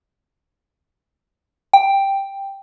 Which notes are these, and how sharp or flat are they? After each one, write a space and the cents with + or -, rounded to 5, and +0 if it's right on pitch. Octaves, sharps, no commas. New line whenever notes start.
G5 +5